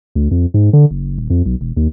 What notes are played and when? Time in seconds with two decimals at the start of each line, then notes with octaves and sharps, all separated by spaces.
0.15 D2
0.31 F2
0.54 G#2
0.73 D3
0.91 F#1
1.18 D#1
1.30 F2
1.46 B1
1.61 E1
1.77 D#2